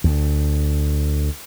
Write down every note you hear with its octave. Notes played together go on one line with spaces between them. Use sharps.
D2